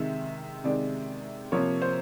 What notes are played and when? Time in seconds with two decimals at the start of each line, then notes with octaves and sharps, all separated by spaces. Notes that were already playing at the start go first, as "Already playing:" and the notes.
Already playing: C3 D#3 G#3 E5
0.64 C3 D#3 G#3 D5
1.52 C3 F3 A#3 C#5
1.82 C5